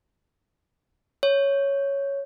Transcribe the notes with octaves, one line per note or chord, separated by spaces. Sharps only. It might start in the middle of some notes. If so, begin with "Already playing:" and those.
C#5